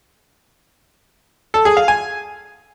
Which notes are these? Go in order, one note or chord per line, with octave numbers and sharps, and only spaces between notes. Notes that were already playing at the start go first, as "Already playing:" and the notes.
A4
G#4
F5
G#5